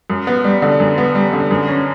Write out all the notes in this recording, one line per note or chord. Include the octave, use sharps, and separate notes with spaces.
F#2
B3
G3
D3
F#2
B3
G3
D3
F#2
C#4